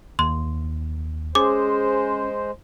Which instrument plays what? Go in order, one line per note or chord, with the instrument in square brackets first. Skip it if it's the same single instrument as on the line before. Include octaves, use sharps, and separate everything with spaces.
[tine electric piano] D#2 [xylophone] C6
[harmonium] G#3 C5 [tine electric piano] C#4 G#4 [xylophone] D6